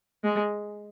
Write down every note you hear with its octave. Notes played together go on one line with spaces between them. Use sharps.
G#3